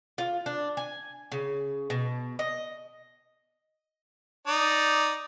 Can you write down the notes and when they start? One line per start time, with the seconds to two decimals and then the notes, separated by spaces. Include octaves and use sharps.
0.18 F4
0.46 D4
0.77 G#5
1.32 C#3
1.90 B2
2.39 D#5
4.47 D#4 D5